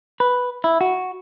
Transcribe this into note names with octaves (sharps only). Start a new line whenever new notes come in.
B4
E4
F#4